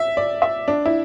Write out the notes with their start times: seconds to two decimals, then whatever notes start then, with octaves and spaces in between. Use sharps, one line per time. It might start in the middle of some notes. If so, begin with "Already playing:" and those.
Already playing: E5
0.17 D5
0.42 E5
0.68 D4
0.86 E4